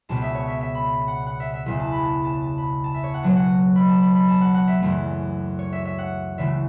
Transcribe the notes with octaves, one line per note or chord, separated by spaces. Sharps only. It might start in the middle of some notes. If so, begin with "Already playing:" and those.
C#2 B2 B3 A5
E5
C#5
E5
E5
B5
F#5
F#5
E5
E5
E1 E2 C#3 E5
A5
B5
A5
A5
A5
B5
A5
E5
C#5
F#5
C#2 B2 F#3 C#4 A5
F#5
B5
A5
B5
B5
A5
F#5
F#5
E5
F#1 F#2 E3 A3
C#5
E5
E5
F#5
C#2 C#3 E3 A3 E5